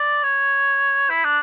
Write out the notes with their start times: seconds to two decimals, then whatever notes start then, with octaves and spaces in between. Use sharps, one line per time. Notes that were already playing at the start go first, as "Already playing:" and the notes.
Already playing: D5
0.23 C#5
1.10 E4
1.24 D4